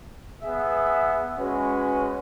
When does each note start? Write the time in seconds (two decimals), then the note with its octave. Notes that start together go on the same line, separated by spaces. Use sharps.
0.43 B3 G#4 E5
1.37 G#3 C#4 F#4 B4